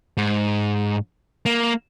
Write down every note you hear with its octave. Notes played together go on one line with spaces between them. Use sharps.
G#2
A#3